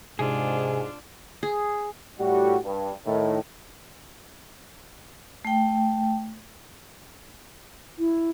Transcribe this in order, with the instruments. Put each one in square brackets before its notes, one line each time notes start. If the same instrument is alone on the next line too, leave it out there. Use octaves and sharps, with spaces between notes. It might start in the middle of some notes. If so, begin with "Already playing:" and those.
[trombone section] G#2 [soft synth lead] C3 [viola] D4 F4 [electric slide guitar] G#4
[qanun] G#4
[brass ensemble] A2 G3 F#4 G4
G2
A2 D#3
[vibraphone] A3 G5
[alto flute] E4